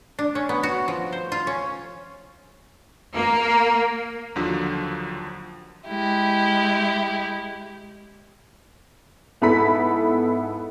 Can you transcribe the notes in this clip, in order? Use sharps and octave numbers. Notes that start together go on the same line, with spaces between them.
D4
C#4
B3
F#4
F3
C5
F4
C#4
A#3
D#2 D3 F3 F#3
G#3 E4 G4
G#2 B3 E4 A4 B5 B6